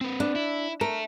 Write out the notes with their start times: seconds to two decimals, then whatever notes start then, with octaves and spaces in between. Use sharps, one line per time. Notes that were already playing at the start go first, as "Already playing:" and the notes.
0.01 C4 B4
0.20 D4
0.35 E4
0.81 A#4 E5 A5